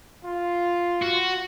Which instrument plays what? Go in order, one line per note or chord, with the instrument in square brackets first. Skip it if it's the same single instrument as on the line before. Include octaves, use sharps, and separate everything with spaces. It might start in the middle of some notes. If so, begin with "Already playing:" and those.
[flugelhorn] F4
[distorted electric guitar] F#4